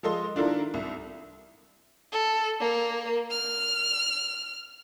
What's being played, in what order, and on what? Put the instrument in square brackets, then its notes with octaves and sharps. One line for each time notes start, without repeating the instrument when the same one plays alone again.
[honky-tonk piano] F3 G#3 A4 D#5 C6
D#3 D4 E4 F4 A4 A#4
C2
[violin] A4
A#3
F6